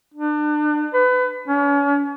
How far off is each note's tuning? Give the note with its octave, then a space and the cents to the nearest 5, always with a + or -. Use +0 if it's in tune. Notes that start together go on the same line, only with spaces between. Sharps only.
D4 +35
B4 +30
C#4 +40